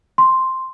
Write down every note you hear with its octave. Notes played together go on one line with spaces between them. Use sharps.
C6